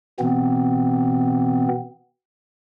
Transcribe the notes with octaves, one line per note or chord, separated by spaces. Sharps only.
B2 E3 B3 C4